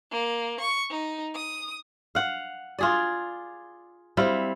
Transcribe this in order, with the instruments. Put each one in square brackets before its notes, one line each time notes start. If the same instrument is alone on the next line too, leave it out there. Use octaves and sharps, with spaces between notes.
[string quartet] A#3
C#6
D#4
D#6
[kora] F5 F#5
F4 G#4 D5
G3 C4 E4 F5